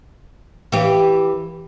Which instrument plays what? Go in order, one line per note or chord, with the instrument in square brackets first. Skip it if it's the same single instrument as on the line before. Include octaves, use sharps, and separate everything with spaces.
[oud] E3 G4